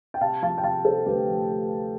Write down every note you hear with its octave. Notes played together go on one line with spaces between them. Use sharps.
G5
C3 F5 A5
F3 F5 A5
G5
C3 F5 A5
C3 A4 C5
D2 G4 B4
F3